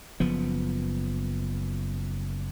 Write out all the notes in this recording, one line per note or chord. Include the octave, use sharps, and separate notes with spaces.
F#1 F3 B3